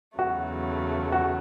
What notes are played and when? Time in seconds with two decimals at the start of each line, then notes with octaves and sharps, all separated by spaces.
0.19 E2 C#3 F#3 A3 F#4
1.12 F#4